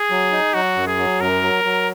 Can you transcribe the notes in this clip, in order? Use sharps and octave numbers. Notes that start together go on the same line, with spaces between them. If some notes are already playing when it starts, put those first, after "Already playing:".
Already playing: G#4
F#3
D#4
F#3 F#4
F#2
G#4
F#3
F#2 A#4
F#3
F#3